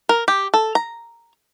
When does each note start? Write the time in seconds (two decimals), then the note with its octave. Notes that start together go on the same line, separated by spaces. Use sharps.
0.09 A#4
0.28 G4
0.54 A4
0.75 A#5